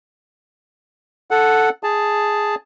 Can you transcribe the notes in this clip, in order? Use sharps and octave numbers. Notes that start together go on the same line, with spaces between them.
A4 F#5
G#4 A5